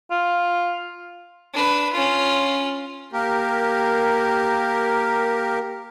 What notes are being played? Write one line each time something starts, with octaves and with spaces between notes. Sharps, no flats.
F4
D4 B4
C#4 F4
A#3 G4 A#4